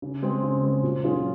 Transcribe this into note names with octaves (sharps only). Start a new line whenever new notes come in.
C#3
G#3 C4
C#3
G#3 C4
A#2
F#3 C#4 F4 G#4